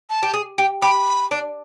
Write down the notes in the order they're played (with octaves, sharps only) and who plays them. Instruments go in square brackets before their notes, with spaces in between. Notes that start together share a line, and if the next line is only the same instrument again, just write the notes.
[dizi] A5
[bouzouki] G4
G#4
G4
[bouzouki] G4 [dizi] B5
[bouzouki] D4